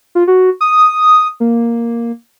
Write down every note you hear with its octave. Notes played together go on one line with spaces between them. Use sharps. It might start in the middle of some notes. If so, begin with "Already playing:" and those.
F4
F#4
D#6
A#3